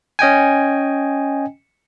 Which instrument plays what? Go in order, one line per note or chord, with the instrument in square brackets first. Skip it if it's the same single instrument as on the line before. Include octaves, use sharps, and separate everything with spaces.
[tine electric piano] C#4 D#5 G5 G#5